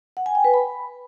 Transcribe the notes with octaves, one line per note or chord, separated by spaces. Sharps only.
F#5
G#5
G5
B4
B5